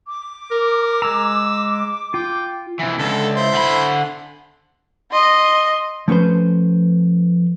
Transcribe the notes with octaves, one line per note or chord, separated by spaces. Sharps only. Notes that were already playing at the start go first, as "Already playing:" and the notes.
D6
A#4
G#3 A#5 E6
F4 G5
C3 E3
C#2 D3 A4
E4 C5
D3 B5
D#5 C6
F3 A3 C#4 B4 C5